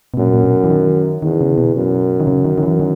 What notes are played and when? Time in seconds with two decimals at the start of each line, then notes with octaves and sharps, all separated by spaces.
0.14 B2
0.17 F#2 A#2
0.34 A#2
0.44 B2
0.64 E3
0.70 D#3
1.22 E2 D#3
1.41 C#3
1.58 B2
1.75 F#2
2.20 D#3
2.27 C#3
2.45 D#3
2.58 D#3
2.63 E3
2.80 D#3